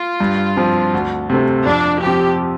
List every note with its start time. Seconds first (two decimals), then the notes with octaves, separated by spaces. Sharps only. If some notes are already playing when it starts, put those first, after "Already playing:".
Already playing: F4
0.20 G2
0.57 F3 C4
0.94 D2
1.30 C3 A3 C4
1.66 F2 D4
2.02 F3 C4 G4